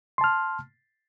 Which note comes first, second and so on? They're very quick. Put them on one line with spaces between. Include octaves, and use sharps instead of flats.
C6 A5 F6